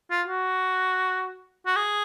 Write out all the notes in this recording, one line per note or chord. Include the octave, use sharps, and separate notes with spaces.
F4
F#4
F#4
G#4